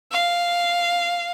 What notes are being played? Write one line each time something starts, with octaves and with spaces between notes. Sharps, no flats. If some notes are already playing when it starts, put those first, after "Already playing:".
F5